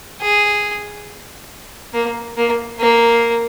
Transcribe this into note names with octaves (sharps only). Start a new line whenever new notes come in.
G#4
A#3
A#3
A#3